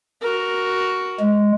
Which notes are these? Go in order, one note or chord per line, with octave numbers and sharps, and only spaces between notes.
F#4 A#4
G#3